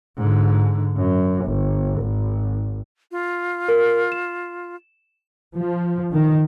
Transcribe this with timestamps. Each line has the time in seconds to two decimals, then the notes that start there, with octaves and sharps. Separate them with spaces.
0.17 G#2 D3
0.97 F#2
1.45 G1
2.00 G#1
3.11 F4
3.68 A#4
4.12 E7
5.59 F3
6.13 D#3